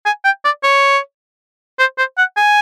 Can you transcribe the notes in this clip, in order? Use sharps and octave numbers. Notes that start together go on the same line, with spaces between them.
G#5
G5
D5
C#5
C5
C5
F#5
G#5